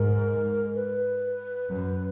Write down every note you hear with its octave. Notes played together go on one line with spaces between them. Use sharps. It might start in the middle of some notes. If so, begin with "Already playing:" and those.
Already playing: G#2 A#4
B4
F#2